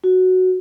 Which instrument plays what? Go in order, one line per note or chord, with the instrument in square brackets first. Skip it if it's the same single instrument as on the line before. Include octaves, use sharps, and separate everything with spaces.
[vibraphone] F#4